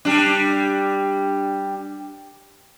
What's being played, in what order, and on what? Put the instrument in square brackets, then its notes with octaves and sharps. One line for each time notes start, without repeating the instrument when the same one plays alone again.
[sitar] G3 D4